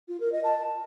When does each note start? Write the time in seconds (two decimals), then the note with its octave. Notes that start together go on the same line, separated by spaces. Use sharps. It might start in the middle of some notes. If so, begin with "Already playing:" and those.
0.08 F4
0.20 A#4
0.32 D#5
0.44 A5